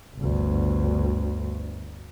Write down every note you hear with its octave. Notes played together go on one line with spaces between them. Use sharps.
G1 D2